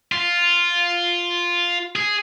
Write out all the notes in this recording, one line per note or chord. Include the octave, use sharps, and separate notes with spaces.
F4
G#4